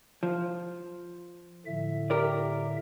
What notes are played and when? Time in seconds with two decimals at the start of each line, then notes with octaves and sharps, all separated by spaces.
0.23 F3
1.66 A2 D3 E5
2.10 G4 A#4 D5